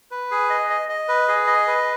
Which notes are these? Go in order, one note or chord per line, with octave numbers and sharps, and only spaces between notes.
B4
G#4
D#5
D#5
D#5
B4
G#4
D#5
B4